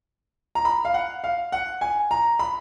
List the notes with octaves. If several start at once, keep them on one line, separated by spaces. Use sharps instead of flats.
A#5
B5
F5
F#5
F5
F#5
G#5
A#5
B5